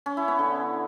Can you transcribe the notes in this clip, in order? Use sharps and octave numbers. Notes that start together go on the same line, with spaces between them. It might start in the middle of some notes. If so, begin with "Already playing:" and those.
C#4
E4
B3
D3